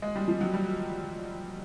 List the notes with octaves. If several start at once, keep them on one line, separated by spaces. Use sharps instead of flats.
G#3
G3
F3
F#3
G3